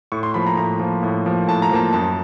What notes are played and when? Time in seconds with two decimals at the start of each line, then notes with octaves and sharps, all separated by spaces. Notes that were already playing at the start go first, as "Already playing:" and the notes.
0.12 A2 C#6
0.23 C6
0.34 F3 A#3 B5
0.47 A#5
0.57 A2 A#5
0.80 F3 A#3
1.03 A2
1.26 F3 A#3
1.48 A2 A5
1.62 A#5
1.71 F3 A#3 A5
1.93 F#2 A5